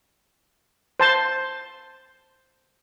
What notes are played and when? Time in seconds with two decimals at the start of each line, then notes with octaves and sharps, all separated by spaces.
1.00 C5 A5 C6